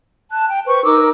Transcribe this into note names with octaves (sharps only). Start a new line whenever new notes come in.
A5 F#6
G5
B4 C5 C#6
D#4 A#4 D6 E6